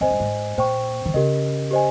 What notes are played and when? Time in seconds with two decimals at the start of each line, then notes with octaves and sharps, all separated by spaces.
0.01 F2 C5 D#5 G#5
0.10 G2
0.20 G#2
0.58 A#2 C5 G5 C#6
1.05 D#3
1.14 C#3 G4 A#4 D#5
1.71 G4 C5 D#5 G#5